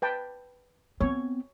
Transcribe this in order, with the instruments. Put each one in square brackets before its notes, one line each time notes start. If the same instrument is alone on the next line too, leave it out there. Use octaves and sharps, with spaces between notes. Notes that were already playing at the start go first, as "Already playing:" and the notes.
[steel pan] B4 G5 A5
[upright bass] B3 C4 [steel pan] C#5